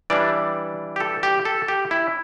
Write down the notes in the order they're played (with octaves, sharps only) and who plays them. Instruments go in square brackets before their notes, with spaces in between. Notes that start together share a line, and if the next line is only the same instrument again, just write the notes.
[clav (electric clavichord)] E3 G3 D4 D5
G4
A4
G4
A4
G4
E4